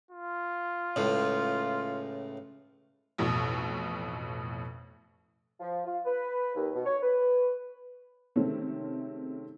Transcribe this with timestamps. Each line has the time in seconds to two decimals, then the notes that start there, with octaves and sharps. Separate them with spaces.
0.11 F4
0.96 C#2 A2
3.18 A1 F2 B2
5.60 F3
5.85 F4
6.05 B4
6.55 D#2
6.73 B2
6.85 C#5
7.02 B4
8.36 C3 D#3 G#3 A3 C4 C#4